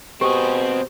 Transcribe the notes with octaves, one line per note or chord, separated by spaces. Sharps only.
B2 C4 G4 G#4 C5